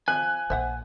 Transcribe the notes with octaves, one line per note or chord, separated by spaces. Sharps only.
F3 G#5 F#6
A#1 C5 E5 F#5